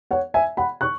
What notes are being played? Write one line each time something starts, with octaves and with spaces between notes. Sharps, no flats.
C#5 F#5
E5 G#5
F#5 B5
C#6 F#6